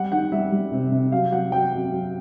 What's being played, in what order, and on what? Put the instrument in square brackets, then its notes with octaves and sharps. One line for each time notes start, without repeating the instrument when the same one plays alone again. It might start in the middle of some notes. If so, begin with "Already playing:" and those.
Already playing: [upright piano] G3 F#5
D#3 F#5
G3 E5
G3
C3
C3
F#3 F5
F#3 F#5
F#3 G5
F#3
F#3